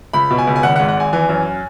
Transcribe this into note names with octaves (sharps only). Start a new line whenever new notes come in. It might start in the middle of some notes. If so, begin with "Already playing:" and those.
C#2 B5
B2
G#5
C#2
G#5
G#1 F#5
F#5
G#2
F#5
G#1 G#5
E3 G#5
F#2